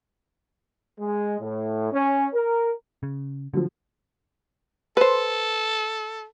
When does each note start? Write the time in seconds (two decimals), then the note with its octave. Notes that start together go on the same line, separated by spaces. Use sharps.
0.98 G#3
1.39 A2
1.91 C#4
2.33 A#4
3.03 C#3
3.54 D3 F3 F#3
4.97 A4 B4 C5